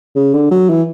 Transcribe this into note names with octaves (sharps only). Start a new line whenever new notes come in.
C#3
D3
F#3
E3